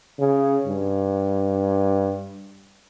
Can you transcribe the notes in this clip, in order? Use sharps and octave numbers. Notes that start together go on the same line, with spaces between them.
C#3
G2